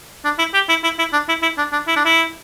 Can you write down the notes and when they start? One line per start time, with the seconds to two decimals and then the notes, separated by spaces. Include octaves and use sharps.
0.25 D4
0.39 E4
0.54 G4
0.69 E4
0.84 E4
0.99 E4
1.13 D4
1.29 E4
1.42 E4
1.58 D4
1.72 D4
1.88 E4
1.96 D4
2.05 E4